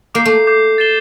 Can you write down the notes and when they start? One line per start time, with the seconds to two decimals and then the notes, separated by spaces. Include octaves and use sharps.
0.14 A#3 D6 G6 C7
0.25 A3
0.47 D6 G6 C7
0.78 A6 C7 E7 G7